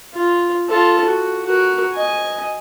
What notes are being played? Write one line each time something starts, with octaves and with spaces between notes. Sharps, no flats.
F4
F4 A4
F#4
F#4 A#4
D#5 G#5